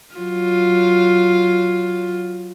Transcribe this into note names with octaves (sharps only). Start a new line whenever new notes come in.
F#3 F4